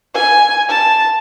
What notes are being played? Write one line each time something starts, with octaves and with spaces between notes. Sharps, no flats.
G#5
A5